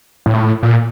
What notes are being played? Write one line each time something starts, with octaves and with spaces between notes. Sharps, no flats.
A2
A#2